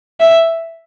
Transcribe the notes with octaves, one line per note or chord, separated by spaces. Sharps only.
E5